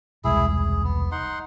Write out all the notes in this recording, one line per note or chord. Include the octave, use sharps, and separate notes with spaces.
E1 C2 G#3 E4 G#4
G#4
B3
D#4 F#5 C6